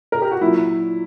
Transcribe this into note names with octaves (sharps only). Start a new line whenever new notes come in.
A#4
G4
F#4
A#2 F#3 E4